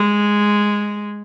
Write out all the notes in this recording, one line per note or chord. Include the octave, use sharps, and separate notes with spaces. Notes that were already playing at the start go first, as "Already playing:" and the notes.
Already playing: G#3